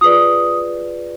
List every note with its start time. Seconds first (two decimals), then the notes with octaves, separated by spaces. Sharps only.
0.01 F4 G#4 B4 D5 D#6